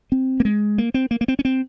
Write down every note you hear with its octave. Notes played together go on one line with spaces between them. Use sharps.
C4
A#3
G#3
A#3
C4
A#3
A#3
C4
C#4
C4